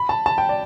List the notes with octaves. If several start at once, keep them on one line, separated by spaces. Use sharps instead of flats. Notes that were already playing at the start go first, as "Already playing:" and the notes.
Already playing: B5
A5
A5
G5
D5